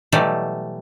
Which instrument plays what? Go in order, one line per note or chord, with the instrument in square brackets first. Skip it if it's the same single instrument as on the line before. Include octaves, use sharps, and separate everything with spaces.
[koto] B2 E3 F#3 G3 A3